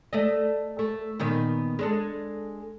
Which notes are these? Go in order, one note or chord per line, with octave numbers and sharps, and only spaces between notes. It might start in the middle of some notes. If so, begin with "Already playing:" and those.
A3 D5 D#5
A3
A#2 D#3 B3
G#3 D4 A4